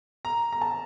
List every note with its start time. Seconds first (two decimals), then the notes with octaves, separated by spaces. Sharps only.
0.25 A#5
0.52 A#5
0.61 A5